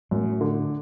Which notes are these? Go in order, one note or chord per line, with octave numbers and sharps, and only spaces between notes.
F#2 A2
D3